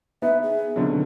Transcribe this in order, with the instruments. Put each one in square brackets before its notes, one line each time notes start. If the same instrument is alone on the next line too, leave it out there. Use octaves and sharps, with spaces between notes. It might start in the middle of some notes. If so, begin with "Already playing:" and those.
[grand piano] B3 B4 [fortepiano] D#4 [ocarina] E5
[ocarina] G#4
[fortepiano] F2 B2 F#3 [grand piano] D3 D#3